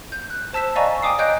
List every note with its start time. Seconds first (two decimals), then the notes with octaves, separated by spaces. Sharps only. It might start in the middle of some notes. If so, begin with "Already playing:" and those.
0.12 G6
0.30 F#6
0.53 C5 A5 E6 B6 E7
0.76 D5 D#5 F5 G#5 A#5 C#6
1.02 G5 G#5 D6 D#6 C7
1.19 C#5 D#5 F#6 G6 D7